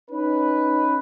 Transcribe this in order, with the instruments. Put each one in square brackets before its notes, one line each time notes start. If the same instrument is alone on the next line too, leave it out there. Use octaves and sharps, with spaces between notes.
[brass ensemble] C#4 D#4 B4